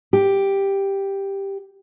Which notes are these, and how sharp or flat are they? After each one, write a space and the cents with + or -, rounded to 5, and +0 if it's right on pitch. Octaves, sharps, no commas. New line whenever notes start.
G4 +5